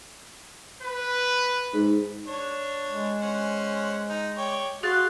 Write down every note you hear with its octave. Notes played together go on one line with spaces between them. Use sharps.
B4
G#2
D4 C#5
G#3
C#4 C5 F#5
D#4
C#5 D5 G5
F#4 G#4 F5 C6 F#6 A6